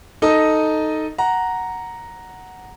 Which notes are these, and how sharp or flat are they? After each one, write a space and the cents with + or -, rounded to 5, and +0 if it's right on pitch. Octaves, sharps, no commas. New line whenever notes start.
D#4 +0 A4 +0 D#5 +0
F#5 +0 A#5 +0